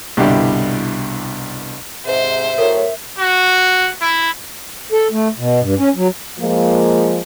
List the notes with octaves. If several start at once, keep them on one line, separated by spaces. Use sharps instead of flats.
C2 G2 B2 D3 E4 G4
G#2 C3 C5 E5
A2 F#3 A#4
F#4
E4
A4
A3
B2
G2
C#4
F#3
F3 G#3 A#3 F4